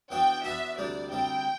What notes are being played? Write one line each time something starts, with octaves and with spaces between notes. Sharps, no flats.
E3 B3 D4 F#4 G5
E3 B3 D4 F#4 E5
D2 C3 G3 D4 D5
D2 C3 G3 D4 G5